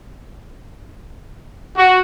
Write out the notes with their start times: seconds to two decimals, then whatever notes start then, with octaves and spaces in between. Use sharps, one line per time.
1.77 F#4